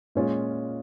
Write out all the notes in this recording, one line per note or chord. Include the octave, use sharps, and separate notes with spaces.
A#2 G#3 C#4 F4